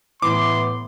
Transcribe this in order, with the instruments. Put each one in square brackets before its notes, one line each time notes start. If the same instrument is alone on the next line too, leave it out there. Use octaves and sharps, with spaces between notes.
[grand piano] A2 E3 [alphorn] B3 [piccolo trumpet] C6 [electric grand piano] D6